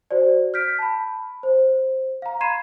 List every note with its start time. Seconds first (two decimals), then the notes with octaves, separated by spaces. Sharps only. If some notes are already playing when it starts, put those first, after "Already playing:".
0.11 F#4 C5 D5
0.54 F6 G6 B6 D7
0.79 A5 B5
1.43 C5
2.22 F5 A#5
2.41 B5 C6 G#6 C7 D#7 E7